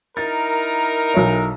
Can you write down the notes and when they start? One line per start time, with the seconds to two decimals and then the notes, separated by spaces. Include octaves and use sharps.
0.17 D#4 E4 A#4 A6
1.14 B1 C#5